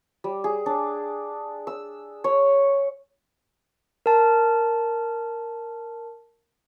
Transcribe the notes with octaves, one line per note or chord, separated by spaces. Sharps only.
G3
G#4
D4
E6
C#5
A#4 A5